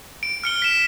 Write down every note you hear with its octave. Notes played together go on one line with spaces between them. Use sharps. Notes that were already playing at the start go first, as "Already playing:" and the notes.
D7
F6 C#7 G7
B6 E7